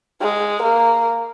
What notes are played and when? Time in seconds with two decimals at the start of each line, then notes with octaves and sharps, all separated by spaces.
0.22 G#3
0.63 A#3